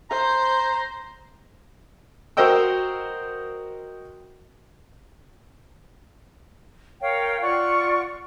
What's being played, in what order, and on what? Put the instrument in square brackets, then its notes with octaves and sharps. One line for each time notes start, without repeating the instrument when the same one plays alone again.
[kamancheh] C5 [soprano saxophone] A#5
[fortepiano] F#4 A#4 C5 D#5 G5 E6
[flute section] A#4 C#5 F5 G5
F4 D5 F#5 C#6